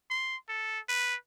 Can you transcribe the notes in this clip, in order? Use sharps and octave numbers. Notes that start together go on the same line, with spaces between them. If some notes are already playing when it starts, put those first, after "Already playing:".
C6
A4
B4